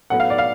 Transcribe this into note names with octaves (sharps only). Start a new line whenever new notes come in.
A2 F#3 B3 F#5
F5
D5
F5